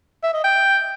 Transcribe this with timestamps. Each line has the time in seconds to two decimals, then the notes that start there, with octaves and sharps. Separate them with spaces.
0.23 E5
0.34 D#5
0.44 G5